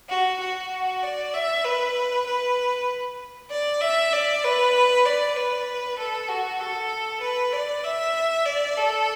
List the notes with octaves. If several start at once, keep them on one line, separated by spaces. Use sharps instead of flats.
F#4
F#4
D5
E5
B4
B4
D5
E5
D5
B4
D5
B4
A4
F#4
A4
B4
D5
E5
D5
A4